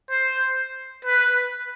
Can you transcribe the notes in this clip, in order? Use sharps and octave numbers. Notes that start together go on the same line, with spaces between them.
C5
B4